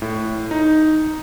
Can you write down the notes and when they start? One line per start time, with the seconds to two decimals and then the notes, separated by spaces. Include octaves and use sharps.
0.02 A2
0.51 D#4